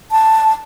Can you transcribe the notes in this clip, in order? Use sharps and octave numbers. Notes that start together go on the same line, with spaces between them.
A5